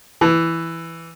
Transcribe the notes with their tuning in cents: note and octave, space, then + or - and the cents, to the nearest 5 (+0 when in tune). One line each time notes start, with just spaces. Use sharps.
E3 +5